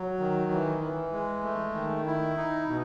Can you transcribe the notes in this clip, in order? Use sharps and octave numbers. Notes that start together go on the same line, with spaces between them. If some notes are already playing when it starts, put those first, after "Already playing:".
Already playing: F#3
D#3
E3
E3
G#3
A3
D#3
E4
D#4
B2